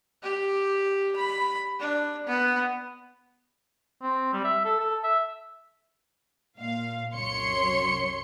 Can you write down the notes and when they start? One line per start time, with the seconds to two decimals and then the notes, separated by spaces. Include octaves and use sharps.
0.23 G4
1.17 B5
1.80 D4
2.27 B3
4.02 C4
4.33 G3
4.44 E5
4.65 A4
4.80 A4
5.03 E5
6.58 A#2 F5
7.12 C2 F#2 F#3 C#5 C6 C#7